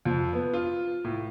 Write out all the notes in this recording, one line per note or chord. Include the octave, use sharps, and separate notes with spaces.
F2
B3
F4
A2